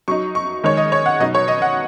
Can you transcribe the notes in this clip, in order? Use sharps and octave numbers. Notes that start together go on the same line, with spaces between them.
F#3 D#4 C#6
C#6
D#3 G#3 D#4 C#5
D#5
C#5
F#5
B2 F#3 D#4 D#5
C#5
D#5
F#5